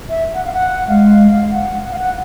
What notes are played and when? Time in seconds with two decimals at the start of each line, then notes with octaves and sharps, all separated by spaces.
0.09 E5
0.34 F#5
0.45 F5
0.53 F#5
0.88 G#3 F5
1.51 F#5
1.83 F#5
1.91 F5
1.99 F#5